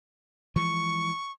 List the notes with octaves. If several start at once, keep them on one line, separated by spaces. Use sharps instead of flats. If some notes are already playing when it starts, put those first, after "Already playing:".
E3 F3 G#3 C#6